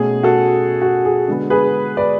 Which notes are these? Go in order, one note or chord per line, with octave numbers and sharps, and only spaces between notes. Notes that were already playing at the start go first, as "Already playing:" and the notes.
Already playing: B2 A3 C#4 G#4
F#4 A4
F#4
G#4
D3 G#3 B3
G#4 B4
B4 D5